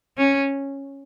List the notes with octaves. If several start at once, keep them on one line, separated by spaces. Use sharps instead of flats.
C#4